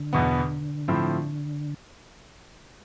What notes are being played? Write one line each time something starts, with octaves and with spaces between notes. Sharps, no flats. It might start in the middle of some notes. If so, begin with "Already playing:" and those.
Already playing: D3
E2 B2 B3
A2 F3 C4 E4